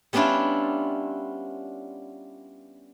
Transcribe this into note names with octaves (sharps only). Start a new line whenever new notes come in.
G3 B3 C#4 D4 E4 F4